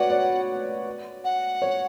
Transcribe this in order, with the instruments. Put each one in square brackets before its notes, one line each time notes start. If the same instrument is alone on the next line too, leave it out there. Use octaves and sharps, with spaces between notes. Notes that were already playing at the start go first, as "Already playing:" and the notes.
Already playing: [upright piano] F#4 B4 C#5 D5 [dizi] F#5
[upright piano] D5
[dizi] F#5
[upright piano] C#5